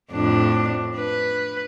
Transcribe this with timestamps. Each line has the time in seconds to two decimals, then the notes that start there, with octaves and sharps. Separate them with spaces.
0.12 F2 A2 D4
0.97 B4